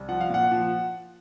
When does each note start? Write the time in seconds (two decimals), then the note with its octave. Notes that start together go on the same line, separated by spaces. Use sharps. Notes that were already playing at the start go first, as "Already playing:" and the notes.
Already playing: C2
0.09 F3 F#5
0.21 F5
0.30 A#2 F#5
0.52 F3